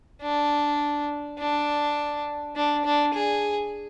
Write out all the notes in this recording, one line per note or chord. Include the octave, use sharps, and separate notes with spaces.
D4
D4
D4
D4
G#4